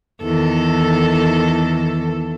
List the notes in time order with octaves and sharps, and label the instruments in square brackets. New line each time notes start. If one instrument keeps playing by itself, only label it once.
[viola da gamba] E2 D#3 A4